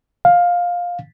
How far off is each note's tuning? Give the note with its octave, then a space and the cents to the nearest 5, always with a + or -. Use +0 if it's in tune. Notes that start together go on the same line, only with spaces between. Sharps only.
F5 +15